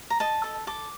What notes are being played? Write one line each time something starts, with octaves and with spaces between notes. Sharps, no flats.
A#5
D#5 A5
A4
A4 D6